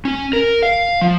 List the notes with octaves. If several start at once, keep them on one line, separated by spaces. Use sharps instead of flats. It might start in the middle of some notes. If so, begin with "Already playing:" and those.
C#4
A#4
F5
F3